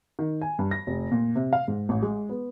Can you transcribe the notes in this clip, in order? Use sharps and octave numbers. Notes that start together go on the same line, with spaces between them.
D#3
G#5
G2
A#6
F1
A#2
C3
F5
G#2
A1
G#3
B3